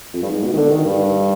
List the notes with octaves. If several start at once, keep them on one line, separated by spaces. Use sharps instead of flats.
F2
G2
G#2
B2
D#3
D3
D#3
G2